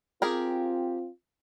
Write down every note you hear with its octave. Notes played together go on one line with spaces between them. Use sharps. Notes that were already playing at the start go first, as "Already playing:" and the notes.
C4 F4 G4 G#4 A#4